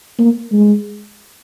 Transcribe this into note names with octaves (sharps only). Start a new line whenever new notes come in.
A#3
G#3